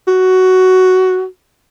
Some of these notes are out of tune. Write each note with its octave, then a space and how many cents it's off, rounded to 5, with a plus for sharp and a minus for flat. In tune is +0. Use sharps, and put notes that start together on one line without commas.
F#4 +10